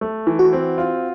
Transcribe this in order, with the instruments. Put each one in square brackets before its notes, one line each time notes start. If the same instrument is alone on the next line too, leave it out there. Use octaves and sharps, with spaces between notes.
[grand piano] A3
E3
[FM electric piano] F#4
[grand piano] C4
F4